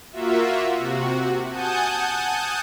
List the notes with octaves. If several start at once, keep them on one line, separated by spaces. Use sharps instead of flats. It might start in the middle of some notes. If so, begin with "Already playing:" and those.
A#3 F4 F#4 E5
C3 F#4
F#5 G#5 A5 D#6 G6